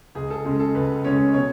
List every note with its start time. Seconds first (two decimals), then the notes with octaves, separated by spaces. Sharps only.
0.15 C#2 G#4
0.30 A4
0.45 C#3 G#3 C#4 G#4
0.59 A4
0.75 C#2 B4
1.04 C#3 G#3 C#4 C#5
1.34 B2 C#5